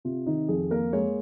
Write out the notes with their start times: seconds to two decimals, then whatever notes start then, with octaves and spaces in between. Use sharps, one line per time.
0.05 C3 F4
0.26 D#3 D#4
0.49 F2 G#4
0.71 A#3 A#4
0.93 G#3 C#5